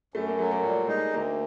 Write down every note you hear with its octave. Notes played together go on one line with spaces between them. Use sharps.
F#2 A3
A#3
F#3 A3
A#3
A#2 G3
G#3 D#4
D2 A#3